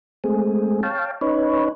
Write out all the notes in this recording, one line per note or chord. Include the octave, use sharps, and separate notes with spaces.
G#3 A3 C4 G#4
C#5 F5 G5 A5
C#4 D#4 B4 C#5